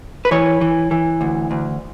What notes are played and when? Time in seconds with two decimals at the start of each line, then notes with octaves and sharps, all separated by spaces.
0.25 B4
0.31 E3 C#5
0.61 E3
0.91 E3
1.21 D2
1.51 D2